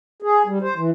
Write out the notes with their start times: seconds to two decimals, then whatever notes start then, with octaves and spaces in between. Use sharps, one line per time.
0.22 G#4
0.46 G3
0.62 C5
0.76 E3